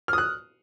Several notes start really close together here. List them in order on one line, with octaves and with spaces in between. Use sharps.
F6 D#6 F#6